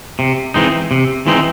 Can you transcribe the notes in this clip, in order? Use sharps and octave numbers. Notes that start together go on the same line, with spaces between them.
C3
E3 G#3 C4 D#4
C3
E3 G#3 C4 D#4